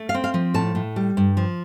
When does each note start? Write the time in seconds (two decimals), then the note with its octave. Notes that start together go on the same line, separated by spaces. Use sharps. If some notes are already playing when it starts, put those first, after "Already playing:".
Already playing: A3
0.09 F5
0.14 C4
0.24 F5
0.34 F3
0.54 A2 A5
0.75 A2
0.96 G3
1.17 G2
1.37 F3